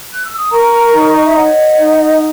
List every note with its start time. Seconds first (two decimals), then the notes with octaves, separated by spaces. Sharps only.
0.11 F#6
0.24 E6
0.36 D#6
0.50 A#4 A#5 C#6
0.92 D#4
0.98 C#5
1.11 D#5
1.24 E5
1.35 C#5 D#5 F#5
1.78 D#4